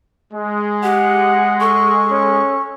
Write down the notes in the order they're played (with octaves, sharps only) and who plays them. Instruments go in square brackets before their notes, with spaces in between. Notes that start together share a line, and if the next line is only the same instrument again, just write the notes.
[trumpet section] G#3
[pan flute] G4 [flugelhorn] F#5
[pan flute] A4 [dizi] C#6
[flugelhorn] C#4